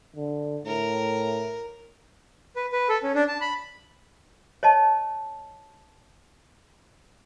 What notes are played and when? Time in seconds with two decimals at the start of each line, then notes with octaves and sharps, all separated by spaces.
0.16 D3
0.66 A2 A#4
2.56 B4
2.72 B4
2.89 A4
3.03 C#4
3.15 D4
3.28 A5
3.41 B5
4.63 C#5 D#5 A5